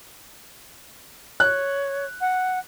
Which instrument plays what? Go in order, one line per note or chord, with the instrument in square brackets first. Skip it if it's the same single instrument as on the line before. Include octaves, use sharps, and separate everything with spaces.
[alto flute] C#5 [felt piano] F#6
[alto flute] F#5